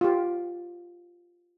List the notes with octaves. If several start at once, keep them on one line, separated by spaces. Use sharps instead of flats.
F4 G4